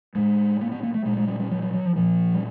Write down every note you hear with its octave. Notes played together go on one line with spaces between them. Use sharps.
A2 G#3
A#3
B3
A#3
A3
A#2 G#3
G#3
G3
G3
F#3
F#3
F#3
F3
A#2 F3
G3